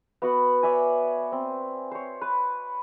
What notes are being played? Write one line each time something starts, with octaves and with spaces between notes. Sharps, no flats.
B3 F#4 F#5
C#5 D5 E5 G#5
C4
C5 C#5
B4